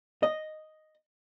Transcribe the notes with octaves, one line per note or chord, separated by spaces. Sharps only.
D#5